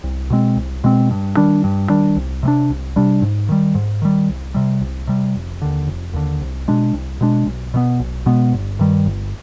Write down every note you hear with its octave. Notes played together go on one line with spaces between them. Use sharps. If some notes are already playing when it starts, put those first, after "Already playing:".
C2
B2 G#3 C4
C2
B2 G#3 C4
G2
D#3 G3 D4
G2
D#3 G3 D4
C2
C3 G3 D4
C2
C3 G3 D4
G#2
D#3 G3
G#2
D#3 G3
C2
C3 G3
C2
C3 G3
F1
D#2 D3
F1
D#2 D3
C2
B2 G#3 D4
C2
B2 G#3 D4
B1
B2 G#3 B3
B1
B2 G#3 B3
G1
G2 D#3 G3
G1